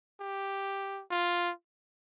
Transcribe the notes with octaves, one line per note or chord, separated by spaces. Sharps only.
G4
F4